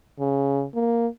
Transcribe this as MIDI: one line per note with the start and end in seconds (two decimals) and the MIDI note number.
0.20 0.65 49
0.74 1.07 58